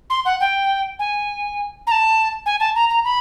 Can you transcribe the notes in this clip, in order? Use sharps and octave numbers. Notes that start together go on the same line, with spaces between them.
C6
F#5
G5
G#5
A#5
A5
G#5
A5
A#5
A#5
B5